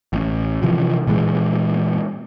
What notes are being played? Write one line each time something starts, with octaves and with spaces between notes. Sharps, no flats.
A1
C3 E3 F3
A#2 E3 G#3